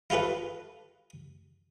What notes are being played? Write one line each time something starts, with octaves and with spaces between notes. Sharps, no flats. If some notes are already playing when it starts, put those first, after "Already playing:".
E4 F4 G4 A4 B4